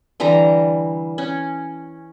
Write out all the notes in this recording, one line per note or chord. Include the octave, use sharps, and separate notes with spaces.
D3 E3 G3 A#5
C#4